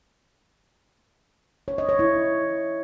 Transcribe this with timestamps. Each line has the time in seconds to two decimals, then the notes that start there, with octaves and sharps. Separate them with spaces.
1.68 C#5
1.78 D#5
1.89 C#5
1.99 E4